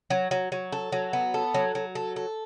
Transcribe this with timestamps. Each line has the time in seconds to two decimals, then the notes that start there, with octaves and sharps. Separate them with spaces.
0.10 F#3
0.31 F#3
0.52 F#3
0.72 A4
0.92 F#3
1.13 B3
1.34 A4
1.54 F#3
1.75 F#3
1.95 A4
2.16 A4